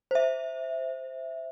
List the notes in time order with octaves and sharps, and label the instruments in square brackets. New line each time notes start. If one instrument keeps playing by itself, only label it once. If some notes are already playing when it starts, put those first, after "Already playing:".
[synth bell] C5 E5